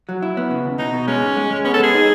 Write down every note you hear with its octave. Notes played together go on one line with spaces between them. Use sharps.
F#3
E4
B3
C#3
D#2
B2 D#4
B2
G#3 C#4
G#2
G#3
G#3
B3 C#4
A4
G#3 G#4
D#4